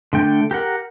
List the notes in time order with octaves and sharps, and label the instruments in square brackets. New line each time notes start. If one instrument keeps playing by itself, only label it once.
[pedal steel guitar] D3 A3 G5
G4 A#4 F#5